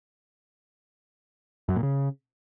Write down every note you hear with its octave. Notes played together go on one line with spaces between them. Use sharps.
F#2
A#2
C#3